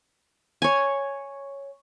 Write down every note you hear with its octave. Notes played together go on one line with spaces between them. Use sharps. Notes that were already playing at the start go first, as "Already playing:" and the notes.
C#5 G#5